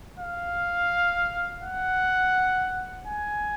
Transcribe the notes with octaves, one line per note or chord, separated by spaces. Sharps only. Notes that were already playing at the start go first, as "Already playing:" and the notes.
F5
F#5
G#5